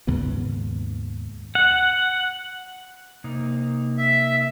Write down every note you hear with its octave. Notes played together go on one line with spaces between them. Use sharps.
D#2 G#2 C#3 B3
F#5
C3 A#3 D#4
E5